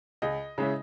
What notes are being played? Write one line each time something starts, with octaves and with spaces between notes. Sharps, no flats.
C#2 D#5
C#3 G#3 C#4 E4